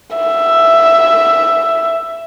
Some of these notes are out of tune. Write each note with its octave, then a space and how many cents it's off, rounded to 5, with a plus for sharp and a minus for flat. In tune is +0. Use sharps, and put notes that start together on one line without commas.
E5 +10